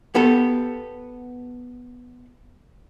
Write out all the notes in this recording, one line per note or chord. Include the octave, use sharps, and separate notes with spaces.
B3 G4 A4